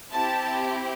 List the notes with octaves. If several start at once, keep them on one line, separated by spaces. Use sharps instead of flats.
C4 E4 G4 A5